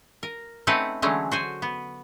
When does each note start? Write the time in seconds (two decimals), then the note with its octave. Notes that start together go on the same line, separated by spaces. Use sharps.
0.23 A#4
0.67 A3 C4 C#4 D#4 B4 F#5
1.02 D3 E3 F#3 G#3 A3 C#4
1.31 F#4 C5 G#5
1.62 B3